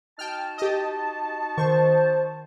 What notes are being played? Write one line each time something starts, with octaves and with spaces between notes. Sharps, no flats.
D#4 F#4 G5 A5 F6
G4 D#5
D#3 C5 C#6